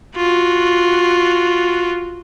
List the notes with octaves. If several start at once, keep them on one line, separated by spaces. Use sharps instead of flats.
F4 F#4